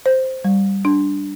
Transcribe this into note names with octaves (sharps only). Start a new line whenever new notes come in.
C5
G3
D4